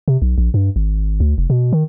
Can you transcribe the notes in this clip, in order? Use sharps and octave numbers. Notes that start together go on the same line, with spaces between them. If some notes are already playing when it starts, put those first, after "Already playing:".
C3
B1
A#1
G2
G#1
D2
F1
B2
D#3